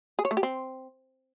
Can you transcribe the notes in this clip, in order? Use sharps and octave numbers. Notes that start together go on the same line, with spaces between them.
G#4
C#5
A3
G4
C4